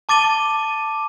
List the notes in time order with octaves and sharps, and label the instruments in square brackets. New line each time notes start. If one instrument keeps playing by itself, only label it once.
[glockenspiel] A5 D6 A6 D#7 G7